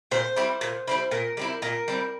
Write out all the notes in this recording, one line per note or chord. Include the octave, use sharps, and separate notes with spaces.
A#2 C5
G3 C4 E4
A#2
G3 C4 E4
A#2 A#4
G3 C4 E4
A#2 A#4
G3 C4 E4